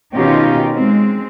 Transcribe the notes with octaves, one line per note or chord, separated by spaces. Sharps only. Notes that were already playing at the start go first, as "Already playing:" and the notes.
B2 D#3 C#4 D#4 F4 G4
G#3 C4